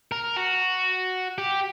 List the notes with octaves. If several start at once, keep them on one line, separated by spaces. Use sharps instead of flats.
A#4
F#4
G4